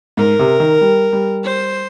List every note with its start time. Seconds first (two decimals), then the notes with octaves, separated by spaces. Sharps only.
0.17 G#2 A#4
0.39 C3
0.60 D#3
0.81 G3
1.13 G3
1.44 C5